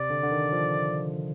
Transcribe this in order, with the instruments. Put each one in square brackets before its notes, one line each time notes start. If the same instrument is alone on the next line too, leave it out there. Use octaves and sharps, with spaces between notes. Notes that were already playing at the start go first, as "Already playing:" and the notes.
Already playing: [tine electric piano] C3 [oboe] D5
[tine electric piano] D3
D3
D#3
F3